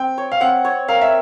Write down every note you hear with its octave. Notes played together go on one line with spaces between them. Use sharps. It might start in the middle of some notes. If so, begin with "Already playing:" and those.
Already playing: C4 G5
C#5
F5
C4 F#5
C#5
A#4 F5
E5